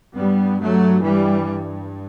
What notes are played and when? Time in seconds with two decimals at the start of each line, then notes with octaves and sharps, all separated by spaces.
0.16 G2 G3 B3
0.60 F#3 A3
1.02 E3 G3